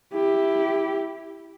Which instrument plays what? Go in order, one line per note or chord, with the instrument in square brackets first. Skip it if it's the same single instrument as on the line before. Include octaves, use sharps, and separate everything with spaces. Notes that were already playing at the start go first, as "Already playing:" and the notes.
[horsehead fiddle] E4 G4